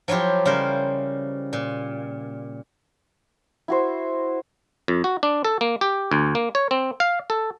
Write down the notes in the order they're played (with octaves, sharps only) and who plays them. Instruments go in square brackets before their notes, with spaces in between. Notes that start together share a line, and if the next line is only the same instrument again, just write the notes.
[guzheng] F3 F#3 E4 F4 G4
C#3 G3 A#4 C5
A#2
[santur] E4 F#4 C5
[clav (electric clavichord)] F2
F#4
D4
A4
A#3
G4
D2
A#3
C#5
C4
F5
A4